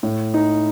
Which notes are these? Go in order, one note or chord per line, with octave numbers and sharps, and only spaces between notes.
A2
D#4